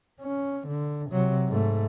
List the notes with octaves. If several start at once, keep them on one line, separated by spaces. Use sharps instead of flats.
C#4
D3
C3 F#3
G#2 A3